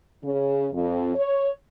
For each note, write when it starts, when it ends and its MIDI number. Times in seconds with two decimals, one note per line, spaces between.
0.23 0.66 49
0.72 1.10 41
1.15 1.50 73